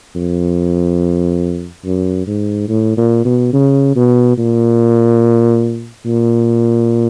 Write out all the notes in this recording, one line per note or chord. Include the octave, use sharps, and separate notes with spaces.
F2
F#2
G#2
A2
A#2
B2
C#3
B2
A#2
A#2